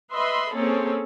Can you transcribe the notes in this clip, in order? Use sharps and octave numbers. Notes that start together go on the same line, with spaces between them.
B4 D#5 E5 B5 C6
A#3 C4 C#4 G#4 A4